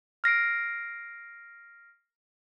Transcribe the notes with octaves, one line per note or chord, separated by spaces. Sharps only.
F6 A#6 C7 D7